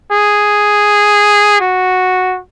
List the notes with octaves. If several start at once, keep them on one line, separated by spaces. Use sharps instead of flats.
G#4
F#4